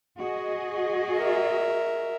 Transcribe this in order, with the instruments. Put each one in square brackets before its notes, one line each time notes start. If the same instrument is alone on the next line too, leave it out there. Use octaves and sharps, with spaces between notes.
[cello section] F#4 G#4 D#5
[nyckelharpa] A#4 E5